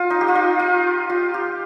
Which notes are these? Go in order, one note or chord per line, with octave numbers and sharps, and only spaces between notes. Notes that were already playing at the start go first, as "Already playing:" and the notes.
Already playing: F4
D#4
G4
F4
D#4
F4
F4
G4